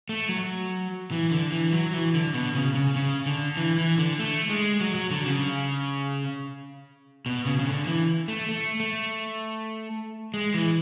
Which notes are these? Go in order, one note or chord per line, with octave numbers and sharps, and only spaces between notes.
A3
F#3
E3
D3
E3
F#3
E3
D3
B2
C#3
C#3
C#3
D3
E3
E3
D3
A3
G#3
F#3
F#3
D3
C#3
B2
C#3
C#3
D3
E3
A3
A3
A3
G#3
E3